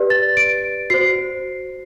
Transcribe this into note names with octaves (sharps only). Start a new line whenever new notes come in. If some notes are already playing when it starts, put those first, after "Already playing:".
Already playing: G4 B4 D5
A6
D7
F#4 C5 C7